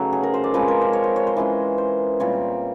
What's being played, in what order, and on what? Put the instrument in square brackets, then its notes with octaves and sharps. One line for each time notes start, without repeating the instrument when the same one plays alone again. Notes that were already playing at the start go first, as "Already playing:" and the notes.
Already playing: [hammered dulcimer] C#3 F#3 A3 B3 C#4 D#4
G#4
A#4
C5
D5
F3 G#3 C4 B4
A#4
C5
C#5
C5
C#5
C5
E3 G#3 C#4
C5
A#2 G3 C4 C#5